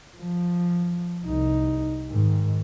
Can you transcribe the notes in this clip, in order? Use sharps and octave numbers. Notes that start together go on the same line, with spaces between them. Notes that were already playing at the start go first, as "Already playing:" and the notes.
F3
C2 D#4
G#2 D#3